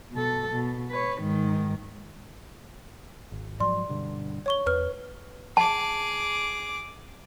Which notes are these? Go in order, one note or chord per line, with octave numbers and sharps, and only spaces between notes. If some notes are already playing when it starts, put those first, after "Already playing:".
B2 A4
B2
B4 C#5
G#2 D#3
G#1
G#2 F3 F#3 D5 C6
G2 B2 D3
C#5 C#6 G7
E2 B4 F6
G#4 A5 D6